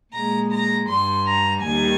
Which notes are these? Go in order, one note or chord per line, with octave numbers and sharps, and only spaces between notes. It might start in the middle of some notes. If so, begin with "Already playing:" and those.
A#2 G#3 A#5
A#5
G2 G3 C6
A#5
D#2 D#3 G3 G#5